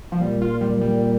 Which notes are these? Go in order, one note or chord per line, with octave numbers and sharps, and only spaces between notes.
F3
A#2 G3
F4
G3
G3